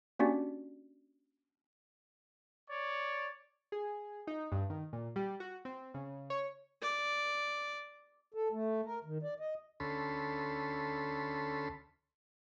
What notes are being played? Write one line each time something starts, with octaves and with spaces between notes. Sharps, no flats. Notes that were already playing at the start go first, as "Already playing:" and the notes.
A#3 C#4 D4 F#4 G4 D5
C#5 D5
G#4
D#4
G2
D#3
A#2
G3
F#4
C4
C#3
C#5
D5
A4
A3
A#4
D#3
D5
D#5
D2 C#4 A4 B5 C6